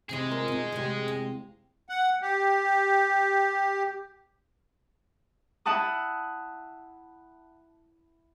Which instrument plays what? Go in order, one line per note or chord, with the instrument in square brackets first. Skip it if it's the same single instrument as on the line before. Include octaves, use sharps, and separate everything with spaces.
[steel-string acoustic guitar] C3 C4 E4 [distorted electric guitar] G#4 D#5
[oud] F4 A#4 F5
[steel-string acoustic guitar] B2 D#4
[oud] E2 C3 G#3 [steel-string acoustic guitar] B3 G4
[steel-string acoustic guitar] F5
[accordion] F#5
G4
[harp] E4 F#5 A5 D#6